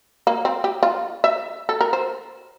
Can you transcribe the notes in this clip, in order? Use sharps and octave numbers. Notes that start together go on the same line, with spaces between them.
A#3
C4
G4
F4
E5
A4
A#4
C5